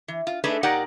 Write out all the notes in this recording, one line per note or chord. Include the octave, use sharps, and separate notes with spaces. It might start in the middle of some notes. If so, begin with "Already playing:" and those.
E3
F4
A3 D4 D#4 G#4 A4 B4
A#2 D#4 G4 A#4 D5 F#5